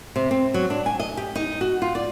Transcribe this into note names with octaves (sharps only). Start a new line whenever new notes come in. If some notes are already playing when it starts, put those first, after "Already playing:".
C3
C4
F#3
D4
G#5
D#5
G4
D#4
F#4
F4
D5